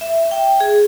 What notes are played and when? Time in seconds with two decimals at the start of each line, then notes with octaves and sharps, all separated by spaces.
0.01 E5
0.31 G5
0.60 G#4